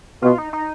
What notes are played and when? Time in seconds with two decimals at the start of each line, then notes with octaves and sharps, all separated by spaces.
0.22 B2 F4
0.38 D#4
0.53 D#4